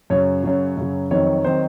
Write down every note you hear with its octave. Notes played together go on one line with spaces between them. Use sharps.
F#2 C#3 F#3 C#5
F#2 C#3 F#3
F#2 C#3 F#3
F2 D#3 F#3 C4 D#4 C#5
D#3 F#3 C4 D#4 C5